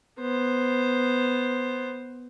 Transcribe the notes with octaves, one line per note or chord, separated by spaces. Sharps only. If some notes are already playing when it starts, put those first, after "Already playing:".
B3 C5